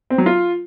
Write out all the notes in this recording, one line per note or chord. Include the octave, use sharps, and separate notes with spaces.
C4
F#3
F4